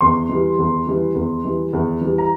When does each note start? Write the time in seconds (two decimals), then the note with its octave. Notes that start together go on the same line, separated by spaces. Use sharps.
0.01 E2 C6
0.29 E3 G3
0.59 E2
0.86 E3 G3
1.15 E2
1.44 E3 G3
1.73 E2
2.01 E3 G3
2.18 A#5